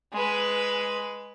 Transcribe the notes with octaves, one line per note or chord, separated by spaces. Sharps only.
G#3 B4